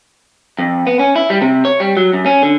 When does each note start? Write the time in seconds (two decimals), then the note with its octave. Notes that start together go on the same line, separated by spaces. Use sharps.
0.59 F2
0.87 B3
0.99 C#4
1.16 E4
1.30 G3
1.42 C3
1.65 C#5
1.80 G3
1.97 F#3
2.13 F#2
2.26 C#4
2.43 D3